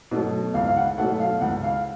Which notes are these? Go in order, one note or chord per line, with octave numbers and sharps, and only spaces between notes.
B2 F#3 A3
C#2 F5
F5
F#5
B2 F#3 A3 F#5
F5
C#2 F#5
F5